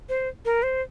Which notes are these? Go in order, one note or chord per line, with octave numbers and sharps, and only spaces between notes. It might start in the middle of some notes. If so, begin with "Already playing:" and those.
C5
A#4
C5